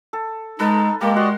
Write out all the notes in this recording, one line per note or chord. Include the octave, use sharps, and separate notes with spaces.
A4
G#3 D#4 A4 B4
G#3 A#3 G4 A#4
F#4 D5 D#5 F#5 C6